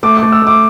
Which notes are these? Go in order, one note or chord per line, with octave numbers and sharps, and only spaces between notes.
A3 D6
D6
A3
E6
A3 D6